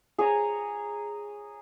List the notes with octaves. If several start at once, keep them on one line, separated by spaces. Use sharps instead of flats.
G#4 C#5 G#5 A#5